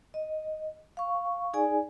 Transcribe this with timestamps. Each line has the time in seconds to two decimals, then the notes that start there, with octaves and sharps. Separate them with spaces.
0.14 D#5
0.97 F5 C#6
1.53 D#4 G#4 D5 G#5